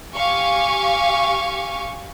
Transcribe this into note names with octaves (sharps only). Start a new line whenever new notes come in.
G4 F5 G#5 C#6